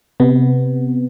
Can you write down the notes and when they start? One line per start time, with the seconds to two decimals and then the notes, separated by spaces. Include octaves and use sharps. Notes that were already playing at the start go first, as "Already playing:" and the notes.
0.20 C3 B3